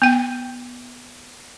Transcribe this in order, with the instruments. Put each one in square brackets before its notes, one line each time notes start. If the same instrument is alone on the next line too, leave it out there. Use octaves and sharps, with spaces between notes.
[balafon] B3 G5